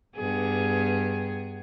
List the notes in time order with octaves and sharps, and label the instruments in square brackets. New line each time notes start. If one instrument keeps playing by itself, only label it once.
[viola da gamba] G2 B3 G#4